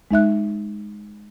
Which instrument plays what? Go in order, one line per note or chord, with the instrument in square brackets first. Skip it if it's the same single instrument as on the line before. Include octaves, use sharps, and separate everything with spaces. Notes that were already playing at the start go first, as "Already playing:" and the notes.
[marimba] G#3 D#4 E5 F#6